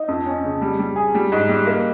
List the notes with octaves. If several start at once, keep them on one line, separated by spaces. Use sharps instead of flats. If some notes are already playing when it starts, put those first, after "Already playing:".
Already playing: D#4
F2
C#4
C#3
G3
G3
G#4
G3
G#2
G3
A#3